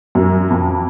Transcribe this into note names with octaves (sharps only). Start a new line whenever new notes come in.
F#2
F2